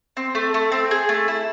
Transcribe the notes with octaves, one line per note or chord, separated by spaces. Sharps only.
C4
A3
A3
C4
G#4
A3
E4